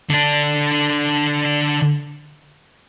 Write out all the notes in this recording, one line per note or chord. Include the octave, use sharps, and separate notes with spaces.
D3 D4